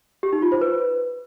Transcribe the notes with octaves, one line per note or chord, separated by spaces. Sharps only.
G4
D#4
F4
C5
B4